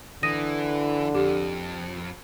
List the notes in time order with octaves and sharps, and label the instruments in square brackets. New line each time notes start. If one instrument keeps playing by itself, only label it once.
[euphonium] D3 [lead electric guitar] E3 [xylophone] D#6 A#6 D#7
[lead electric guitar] F2 [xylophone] G4